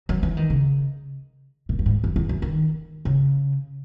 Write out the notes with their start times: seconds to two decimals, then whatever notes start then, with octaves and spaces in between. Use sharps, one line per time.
0.09 F#3
0.23 E3
0.37 D#3
0.50 C#3
1.69 A#2
1.79 F#2
1.86 G#2
2.04 F#2
2.16 E2
2.29 F#2
2.42 D#3
3.05 C#3